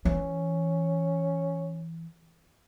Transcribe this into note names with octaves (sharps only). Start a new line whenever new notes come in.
E3 C#4